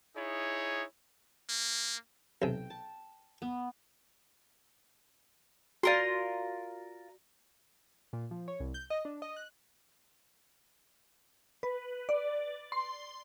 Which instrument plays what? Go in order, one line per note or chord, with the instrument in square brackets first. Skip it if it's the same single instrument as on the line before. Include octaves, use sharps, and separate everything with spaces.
[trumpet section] D#4 E4 G#4 C#5
[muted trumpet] A#3
[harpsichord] B1 C3 [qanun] G5
[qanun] A5
B3
[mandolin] F4 A#4 C6 [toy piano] F#4 D5
[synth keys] A#2
F3
C#5
C2
G6
D#5
D4
D#5
F#6
[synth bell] B4
D5
C6